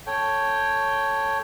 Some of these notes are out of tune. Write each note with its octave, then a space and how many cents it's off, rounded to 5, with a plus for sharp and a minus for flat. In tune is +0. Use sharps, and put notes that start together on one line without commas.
A4 +0 C#5 +0 G5 +0